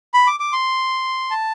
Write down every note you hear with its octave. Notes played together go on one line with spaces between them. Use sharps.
B5
D6
D6
C6
A5